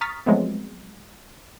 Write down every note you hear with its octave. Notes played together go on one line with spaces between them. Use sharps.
A#5 C#6 D#6 F6 A6 B6
F3 F#3 G#3 A3 B3 C4